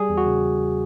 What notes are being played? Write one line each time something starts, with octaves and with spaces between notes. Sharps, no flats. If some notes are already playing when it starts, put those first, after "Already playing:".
Already playing: G3 G#4
E2
F#4
C#3